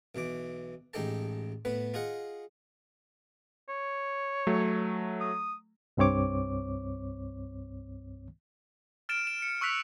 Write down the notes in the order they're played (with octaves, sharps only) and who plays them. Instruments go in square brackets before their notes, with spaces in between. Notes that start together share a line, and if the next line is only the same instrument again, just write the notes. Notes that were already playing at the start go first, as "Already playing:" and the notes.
[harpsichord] B1 B2 E3 D6
A1 G#3 D#4 G4 A4 A5
A2 B3 B4
F4 G#4 D#5 F#5
[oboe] C#5
[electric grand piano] F#3 A3
[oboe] D#6
[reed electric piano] C2 G2 C4 C#5 D6
[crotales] F6 A6 D7 E7
E7
C#7
C#6 E6 F#6 B6 F7